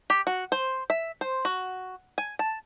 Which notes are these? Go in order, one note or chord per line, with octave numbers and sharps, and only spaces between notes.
G4
F#4
C5
E5
C5
F#4
G#5
A5